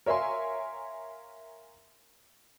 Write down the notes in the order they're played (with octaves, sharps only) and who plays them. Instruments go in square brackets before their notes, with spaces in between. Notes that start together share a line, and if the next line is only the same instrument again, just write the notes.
[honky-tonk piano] A#4 C#5 E5 F5 G#5 C6